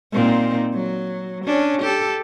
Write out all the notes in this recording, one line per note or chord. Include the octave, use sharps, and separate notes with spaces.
A#2 C4 D#4
F#3
C#4 D4
G4 A4